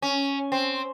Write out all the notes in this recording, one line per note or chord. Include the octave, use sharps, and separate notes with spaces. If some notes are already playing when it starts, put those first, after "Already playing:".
C#4
C4